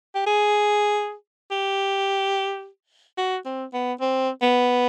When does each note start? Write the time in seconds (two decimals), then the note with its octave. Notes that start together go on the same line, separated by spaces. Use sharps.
0.15 G4
0.26 G#4
1.51 G4
3.18 F#4
3.45 C4
3.73 B3
4.00 C4
4.42 B3